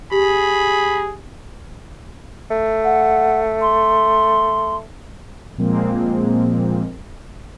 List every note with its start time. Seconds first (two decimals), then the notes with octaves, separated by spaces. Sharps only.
0.11 G4 G#4 B5
2.50 A3
2.84 F#5
3.62 C6
5.58 A#2 F3 G#3 A#3 C4